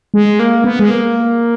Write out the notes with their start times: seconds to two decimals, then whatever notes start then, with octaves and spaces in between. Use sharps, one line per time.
0.14 G#3
0.39 A#3
0.64 B3
0.79 G#3
0.90 A#3